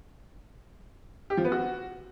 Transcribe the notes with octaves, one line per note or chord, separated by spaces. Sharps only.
G4
F3
B3
F#4